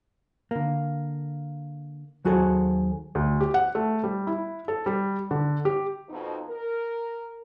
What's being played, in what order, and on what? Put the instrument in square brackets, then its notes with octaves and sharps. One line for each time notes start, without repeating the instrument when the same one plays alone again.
[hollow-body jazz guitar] D3 A#3
D#2 F#3 F#4 G#4 A4 C5
[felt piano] D2
G4
F#5
A3
G3
E4
A4
G3
D3
G4
[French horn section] F2 B2 D#4
A#4